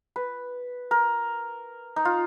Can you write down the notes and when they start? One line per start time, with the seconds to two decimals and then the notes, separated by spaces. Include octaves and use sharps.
0.16 B4
0.91 A#4
1.96 D#4
2.05 F4